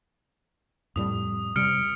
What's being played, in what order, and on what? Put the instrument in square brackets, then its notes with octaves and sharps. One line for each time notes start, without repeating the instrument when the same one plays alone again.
[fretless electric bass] F2 A2 G3 [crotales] D#6
[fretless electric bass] C3 G3 [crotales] F6 C#7 D7